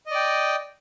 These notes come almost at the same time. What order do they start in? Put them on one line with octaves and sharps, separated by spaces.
D#5 D5 G5